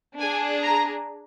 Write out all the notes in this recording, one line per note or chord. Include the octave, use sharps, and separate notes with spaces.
D4 G#4 G#5
A#5